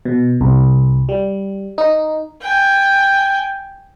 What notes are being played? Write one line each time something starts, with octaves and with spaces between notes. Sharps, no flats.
B2
C2
G3
D#4
G5 G#5